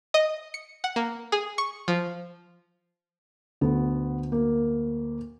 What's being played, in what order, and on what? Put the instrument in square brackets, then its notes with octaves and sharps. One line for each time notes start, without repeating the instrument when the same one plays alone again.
[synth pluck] D#5
C#7
F#5
A#3
G#4
C#6
F3
[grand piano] D2 [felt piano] B3
[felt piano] A#3